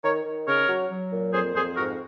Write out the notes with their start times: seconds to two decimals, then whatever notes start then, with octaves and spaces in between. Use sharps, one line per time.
0.04 D#3 A#4 C#5
0.26 D#3
0.47 C#3 A#4 C#5
0.68 F#3
0.90 F#3
1.12 A#2
1.33 F2 G#4 C5
1.55 F2 G#4 C5
1.76 G#2 F#4 A#4